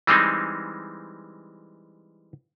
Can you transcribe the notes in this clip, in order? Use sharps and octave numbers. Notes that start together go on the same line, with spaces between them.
E3 G3 G#3 C4 D#4